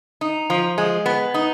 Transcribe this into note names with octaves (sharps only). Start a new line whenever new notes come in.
D#4
F3
G#3
B3
D#4